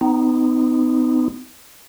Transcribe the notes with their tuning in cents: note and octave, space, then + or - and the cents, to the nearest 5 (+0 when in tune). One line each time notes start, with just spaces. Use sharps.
B3 +45 D#4 +0